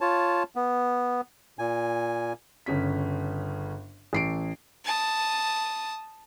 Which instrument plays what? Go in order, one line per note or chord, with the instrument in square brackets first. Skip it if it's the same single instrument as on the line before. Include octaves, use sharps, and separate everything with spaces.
[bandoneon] F4 C#5 A5
B3
A#2 G#5
[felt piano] G1 C#3 C#4 B6
A1 C7 D7
[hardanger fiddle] A5 D#6